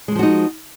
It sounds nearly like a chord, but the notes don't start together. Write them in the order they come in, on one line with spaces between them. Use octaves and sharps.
G#3 F#3 F3 F#4 D#4